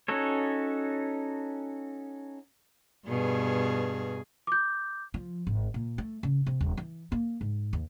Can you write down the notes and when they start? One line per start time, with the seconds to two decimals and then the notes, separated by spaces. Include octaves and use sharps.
0.08 C#4 D#4 F#4 A4 C#5
3.08 G2 B2 G#4
4.47 D6 G6
5.14 F3
5.47 G#1
5.74 A#2
5.98 A3
6.23 C#3
6.46 C3
6.61 D#1
6.77 E3
7.12 A#3
7.41 G#2
7.73 D#2